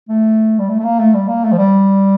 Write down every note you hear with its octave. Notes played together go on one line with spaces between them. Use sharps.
A3
G3
A3
A3
A#3
A3
G3
A#3
A3
F3
G3